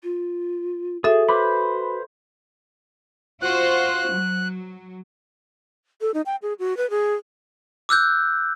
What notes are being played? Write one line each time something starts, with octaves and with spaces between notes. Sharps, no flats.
F4
F#4 G#4 A4 E5
B4 C5 B5 D6
F4 F#4 C5 F#6
F#3
A4
D#4
G5
G#4
F#4
B4
G#4
D6 E6 F#6 G6